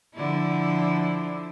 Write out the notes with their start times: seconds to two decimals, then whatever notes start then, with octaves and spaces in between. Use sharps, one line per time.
0.14 D3 F3 E4